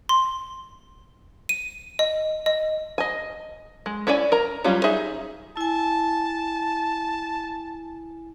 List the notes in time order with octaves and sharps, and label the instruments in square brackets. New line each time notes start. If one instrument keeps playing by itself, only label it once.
[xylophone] C6
D#7
D#5
D#5
[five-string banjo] D#5 G#5
G#3
C#4 E4 C#5 D5 G#5
A#4 A#5
F#3 G3 C#4 F4
D#4 G#4 E5
[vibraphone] E4 G#5 [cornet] A5